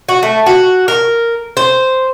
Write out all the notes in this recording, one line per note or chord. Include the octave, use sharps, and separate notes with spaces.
F#4
A3
F#4
A#4
C5